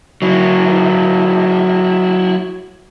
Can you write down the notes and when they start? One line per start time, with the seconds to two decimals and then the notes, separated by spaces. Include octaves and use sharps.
0.22 F#3 E4